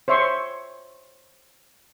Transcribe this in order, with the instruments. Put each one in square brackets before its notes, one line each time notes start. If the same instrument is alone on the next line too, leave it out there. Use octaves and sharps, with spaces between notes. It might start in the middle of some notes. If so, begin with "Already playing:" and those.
[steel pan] C5 C#5 E5 C6 C#6